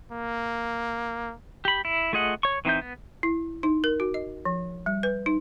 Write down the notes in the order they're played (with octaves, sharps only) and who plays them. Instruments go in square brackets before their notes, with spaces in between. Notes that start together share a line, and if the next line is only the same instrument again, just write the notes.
[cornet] A#3
[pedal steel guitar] G4 B5
E4
A3 F4 G#4 D#5 F#5
C#5 C#6
E3 C4 D#4 E5 G6
B3
[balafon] E4
D#4
A#4
F#4
D#5
F3
G3
B4
D#4